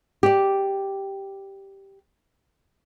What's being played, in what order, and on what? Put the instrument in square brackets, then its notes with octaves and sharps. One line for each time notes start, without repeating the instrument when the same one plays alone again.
[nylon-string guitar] G4 D5